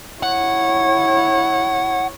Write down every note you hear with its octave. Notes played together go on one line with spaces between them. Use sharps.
E4 C#5 F#5